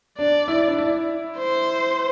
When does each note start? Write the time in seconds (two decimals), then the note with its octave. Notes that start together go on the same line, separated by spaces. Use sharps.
0.18 D4 D5
0.48 E4
0.68 D4
0.78 E4
1.39 C5